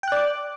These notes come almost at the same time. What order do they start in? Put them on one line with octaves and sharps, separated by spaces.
G5 F#6 D5 D6